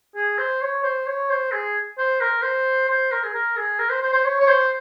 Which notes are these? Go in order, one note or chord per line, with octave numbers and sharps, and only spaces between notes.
G#4
C5
C#5
C5
C#5
C5
G#4
C5
A#4
C5
C5
A#4
G#4
A#4
G#4
A#4
C5
C5
C5
C#5
C#5
C5